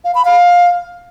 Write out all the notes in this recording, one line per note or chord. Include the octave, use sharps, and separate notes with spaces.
F5
B5
F5